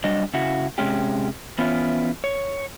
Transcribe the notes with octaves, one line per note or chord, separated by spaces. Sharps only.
F#3 G3 D4 D#5
C#3 E4 F#4
C3 G#3 C#4 G4
E3 B3 C#4 E4 F4
C#5